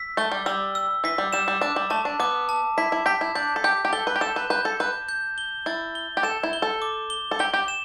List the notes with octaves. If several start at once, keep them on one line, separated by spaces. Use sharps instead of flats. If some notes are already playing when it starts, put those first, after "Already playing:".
Already playing: E6 B6
A3 G7
G3
G3 E6
E6
E3 B6
G3
G3 E7
G3
D4 D6
G3
A3 A5
D4
B3 D6
A5
E4 B6
E4
G4 B6
E4
D4 G6
A4
G4 G6
G4
A4 G7
B4
G4
A4 E7
B4
B4 G6
A4
B4 G6
G6
G7
E4 A6
G7
G4
A4 E7
E4
G7
A4
D6
G7
A4
G4 G7
G4
E7